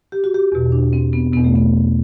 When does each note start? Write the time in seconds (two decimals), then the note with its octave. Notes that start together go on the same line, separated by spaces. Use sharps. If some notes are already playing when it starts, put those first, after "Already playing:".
0.12 G4
0.24 F#4
0.34 G4
0.52 E2 B2
0.72 D4
0.93 C4
1.13 B3
1.33 E2 B2 B3
1.44 A3
1.56 B3